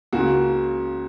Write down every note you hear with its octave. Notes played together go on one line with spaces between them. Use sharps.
C#2 C#3 A#3 F#4